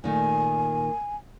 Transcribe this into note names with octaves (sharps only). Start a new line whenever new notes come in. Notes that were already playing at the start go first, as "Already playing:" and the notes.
A#2 D#3 A3 G#5